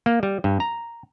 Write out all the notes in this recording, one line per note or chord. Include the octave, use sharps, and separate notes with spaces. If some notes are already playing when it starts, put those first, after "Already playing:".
A#3
G3
G2
A#5